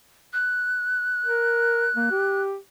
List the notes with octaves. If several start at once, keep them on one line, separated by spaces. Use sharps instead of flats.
F#6
A#4
A#3
G4